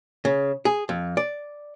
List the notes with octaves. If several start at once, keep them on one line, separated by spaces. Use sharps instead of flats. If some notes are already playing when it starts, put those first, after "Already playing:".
C#3
G#4
F2
D5